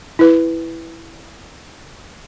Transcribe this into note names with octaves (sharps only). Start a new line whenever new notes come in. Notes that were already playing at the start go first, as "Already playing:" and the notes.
E4 B4